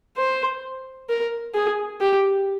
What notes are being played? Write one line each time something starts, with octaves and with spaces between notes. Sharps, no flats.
C5
A#4
G#4
G4